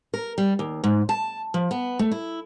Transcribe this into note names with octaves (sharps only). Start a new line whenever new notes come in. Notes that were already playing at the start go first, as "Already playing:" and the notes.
A#4
G3
D#2
G#2
A5
F3
B3
A3
E4